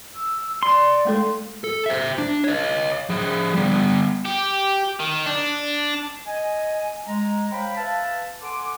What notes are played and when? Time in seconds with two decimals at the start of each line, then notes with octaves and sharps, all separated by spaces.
0.14 E6
0.63 D5 C6
1.05 G#3 A3 A4
1.64 A4
1.86 C5 E5
2.18 D4
2.44 C#5 D#5
3.10 F3 G#4
3.55 G3 B3
4.25 G4
4.99 D#3
5.26 D4
6.26 D#5 G#5
7.07 G#3 A#5
7.53 C5 C#5 F5 G5 B5
7.76 B4 E5 F5 G#5 A5
8.42 A4 F#5 G#5 C6 D6